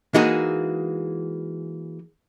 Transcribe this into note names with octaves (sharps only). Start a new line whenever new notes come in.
E3 G#3 A#3 D#4 F#4 G#4